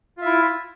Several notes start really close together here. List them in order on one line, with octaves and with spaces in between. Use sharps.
F4 E5 E4